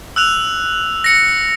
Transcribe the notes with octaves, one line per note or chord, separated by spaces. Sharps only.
E6 F#6 F7
A#6 C#7